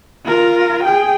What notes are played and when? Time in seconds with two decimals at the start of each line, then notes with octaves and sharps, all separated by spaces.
0.25 F4 A#4
0.84 G#4 G5